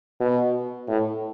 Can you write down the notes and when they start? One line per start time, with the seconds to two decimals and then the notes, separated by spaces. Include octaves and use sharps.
0.20 B2
0.88 A2